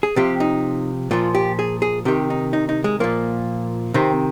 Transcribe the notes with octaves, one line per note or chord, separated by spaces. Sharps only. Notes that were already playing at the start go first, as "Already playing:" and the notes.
G#4
C3 F3 G4
D#4
A#2 F3 F4
G4
G#4
G#4
C3 D#3 G4
D#4
D#4
D#4
G#3
A#2 F3 A#3
C3 D#3 C4